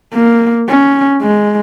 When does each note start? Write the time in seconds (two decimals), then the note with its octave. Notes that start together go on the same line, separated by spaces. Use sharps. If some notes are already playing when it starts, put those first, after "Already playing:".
0.14 A#3
0.68 C#4
1.22 G#3